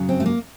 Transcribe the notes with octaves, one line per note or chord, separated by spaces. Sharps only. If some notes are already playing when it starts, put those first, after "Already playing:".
Already playing: F#2 C#3 F#3
C4
A3
A#3